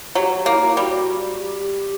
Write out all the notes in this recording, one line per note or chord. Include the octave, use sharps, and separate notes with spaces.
F#3 G4
F#4
A#3 E4
F#4
E4
G3 F#4
G4